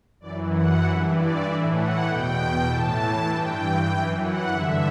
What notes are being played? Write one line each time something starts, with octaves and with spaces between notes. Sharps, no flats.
F#2 E3 D5
F#5
G2 E3 E5
D5
A2 E3 E5
F#5
E2 B2 G5
A2 E3 A5
G2 E3 G5
F#2 E3 G5
F#5
G2 D3 E5